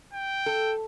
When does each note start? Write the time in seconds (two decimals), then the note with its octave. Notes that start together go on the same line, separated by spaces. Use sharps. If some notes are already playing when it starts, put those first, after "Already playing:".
0.14 G5
0.46 A4